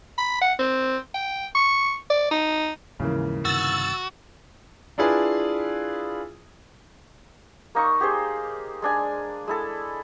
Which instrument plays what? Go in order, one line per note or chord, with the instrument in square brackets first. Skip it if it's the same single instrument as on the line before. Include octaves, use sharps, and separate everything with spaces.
[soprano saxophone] B5
F#5
C4
G5
C#6
D5
D#4
[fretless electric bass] D#2 G#2 F3 [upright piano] C#3 E3 A#3
[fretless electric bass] G2 C3 D#3 [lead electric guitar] F#4 [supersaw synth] E6 A6
[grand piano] D4 E4 F4 G#4 B4
[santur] A#3 D#4 C#6
G4 G#4 C5
G#3 D4 G#5
G#3 E4 A4